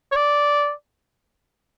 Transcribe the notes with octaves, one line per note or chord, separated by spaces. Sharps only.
C#5
D5